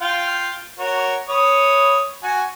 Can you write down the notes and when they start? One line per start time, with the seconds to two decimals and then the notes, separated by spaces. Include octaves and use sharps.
0.01 F4 F5 G5
0.79 F#4 A#4 C#5
1.29 B4 C#5 D#6
2.23 F#4 G#5